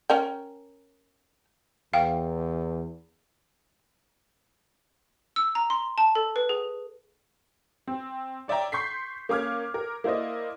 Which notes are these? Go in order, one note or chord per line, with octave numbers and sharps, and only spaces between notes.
C#4 A#4 G5
E2 F5 G5
E6
A#5
C6
A5
A4
B4
G#4
C4
C#5 D5 E5 G5 A#5
C6 C#6 G6 B6 C7
A#3 C#4 D6 F6 G#6
A#4
A#3 E4 C5 D5 D#5